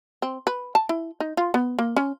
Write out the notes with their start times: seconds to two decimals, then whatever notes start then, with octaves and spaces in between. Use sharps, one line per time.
0.22 C4
0.47 B4
0.75 A5
0.89 E4
1.20 D#4
1.37 F4
1.54 B3
1.79 A#3
1.96 C#4